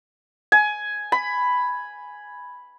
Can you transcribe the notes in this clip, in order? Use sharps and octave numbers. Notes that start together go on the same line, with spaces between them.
G#5
B5